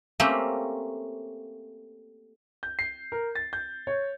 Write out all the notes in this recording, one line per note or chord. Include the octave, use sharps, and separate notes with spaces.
A3 A#3 C4 C#4 G4
G6
C7
A#4
A6
G6
C#5